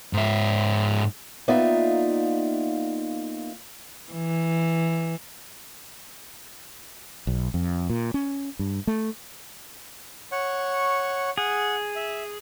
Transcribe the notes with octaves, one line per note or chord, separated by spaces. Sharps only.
G#2 E5
A#3 B3 D#4 F4 D5 E5
E3
B1
F2
A#2
C#4
G2
A3
C#5 F#5 C#6
G#4 F#5
E5